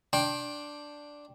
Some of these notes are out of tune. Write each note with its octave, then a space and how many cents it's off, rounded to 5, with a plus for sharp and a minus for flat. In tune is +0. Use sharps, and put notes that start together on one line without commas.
D4 +0 G5 +5 C6 +40